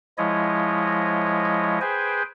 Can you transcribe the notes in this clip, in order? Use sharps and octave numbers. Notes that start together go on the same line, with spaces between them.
F3 G#3 E4 C#5 D#5
G#4 B4 C5 G5 G#5